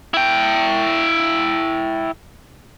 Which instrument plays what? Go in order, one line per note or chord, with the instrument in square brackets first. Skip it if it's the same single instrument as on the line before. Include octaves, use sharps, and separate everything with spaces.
[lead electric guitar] E4 G5